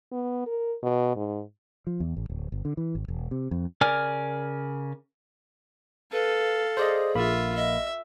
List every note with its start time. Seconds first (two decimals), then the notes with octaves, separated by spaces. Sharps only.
0.12 B3
0.46 A#4
0.83 B2
1.16 G#2
1.87 F3
2.00 E2
2.17 A1
2.29 D1
2.52 G1
2.65 D3
2.77 E3
2.95 G#1
3.08 E1
3.31 C3
3.51 F2
3.81 C#3 A#4 D5 G#5 F6
6.12 A4 B4 F5
6.77 G#4 C5 D5 D#5
7.15 A#1 A#3 F4 E5 B5
7.56 D#5 E5